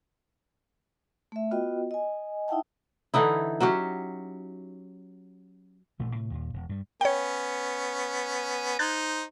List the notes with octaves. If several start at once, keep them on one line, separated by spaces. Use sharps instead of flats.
A3 E5
B3 F4 F#4 B4 D#5 G5
D#5 G#5
D#4 E4 E5 F#5 G5 A5
D3 E3 D#4 E4
F#3 C#4 F#4 G4
A1 G2 A#2 A3
A2 C3
D#2 A#2
E1
G2 G3
B3 C#4 C#5 G5
D#4 C5 F#6 G#6 A6